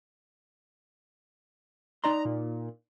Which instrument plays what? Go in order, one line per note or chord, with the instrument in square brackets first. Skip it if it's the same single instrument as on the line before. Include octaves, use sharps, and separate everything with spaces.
[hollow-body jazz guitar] D#4 D5 C6 [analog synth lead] A#5
[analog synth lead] A#2